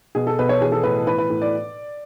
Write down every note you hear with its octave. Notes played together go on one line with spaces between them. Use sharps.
B2 G#4
A4
B2 B4
C#5
E3 G#4
A4
A2 B4
E3 B4
B4
A2
D5